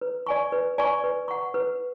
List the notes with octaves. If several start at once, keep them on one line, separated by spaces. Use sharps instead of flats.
B4
D5 G#5 C#6
B4
D5 G#5 C#6
B4
F#5 C#6
B4